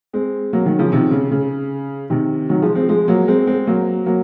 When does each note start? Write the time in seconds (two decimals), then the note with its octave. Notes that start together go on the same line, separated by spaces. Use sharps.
0.13 G#3 C4
0.53 F#3 A#3
0.66 D#3 F#3
0.79 C#3 F3
0.92 C3 D#3
1.11 C#3
1.31 C#3
2.10 C3 D#3
2.49 D#3 F#3
2.62 F3 G#3
2.75 G#3 C4
2.89 F3 G#3
3.08 F#3 A#3
3.28 G#3 C4
3.47 G#3 C4
3.67 F#3 A#3
4.06 F#3 A#3